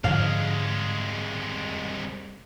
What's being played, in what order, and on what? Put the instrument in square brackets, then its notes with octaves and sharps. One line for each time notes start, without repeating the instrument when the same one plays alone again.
[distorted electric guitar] C2 G#3 [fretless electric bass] G#2 D3 F3 [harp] F5